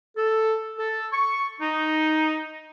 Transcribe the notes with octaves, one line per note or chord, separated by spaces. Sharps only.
A4
A4
C#6
D#4